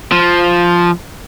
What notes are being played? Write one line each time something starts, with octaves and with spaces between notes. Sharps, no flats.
F3